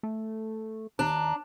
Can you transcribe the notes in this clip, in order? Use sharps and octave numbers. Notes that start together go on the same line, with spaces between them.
A3
D#2 D4 A#5